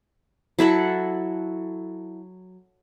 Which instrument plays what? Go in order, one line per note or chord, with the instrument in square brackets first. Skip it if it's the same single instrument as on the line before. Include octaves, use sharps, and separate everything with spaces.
[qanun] F#3 E4 A4 F#5